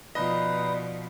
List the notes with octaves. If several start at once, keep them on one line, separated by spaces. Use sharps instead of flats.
B2 F3 D#4 B4 D5 D#5